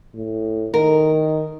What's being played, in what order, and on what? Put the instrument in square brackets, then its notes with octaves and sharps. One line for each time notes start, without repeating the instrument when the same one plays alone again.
[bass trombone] A2
[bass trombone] D#3 [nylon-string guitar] A#4